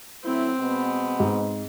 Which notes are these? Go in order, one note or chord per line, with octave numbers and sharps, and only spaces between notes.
F#3 A3 C4 E4
B2 G#3 B3
G#2